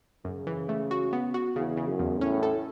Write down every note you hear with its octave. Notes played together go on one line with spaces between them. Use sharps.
F#2 C#3
E3
A3
F#4
B3
F#4
E2 C#3
C#3
F#2
E2
A2 C#4
A4